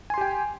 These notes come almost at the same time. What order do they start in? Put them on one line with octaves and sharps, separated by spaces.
G#5 C6 G4 G5